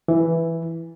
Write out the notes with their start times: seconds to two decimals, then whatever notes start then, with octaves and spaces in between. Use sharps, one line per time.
0.08 E3